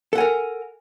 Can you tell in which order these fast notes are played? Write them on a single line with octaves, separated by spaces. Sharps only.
A4 F#5 G#5 A#4